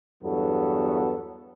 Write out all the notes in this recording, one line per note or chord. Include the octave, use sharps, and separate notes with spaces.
E2 G2 F#3 B3 A4